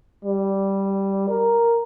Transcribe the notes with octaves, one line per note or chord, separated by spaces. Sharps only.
G3
A#4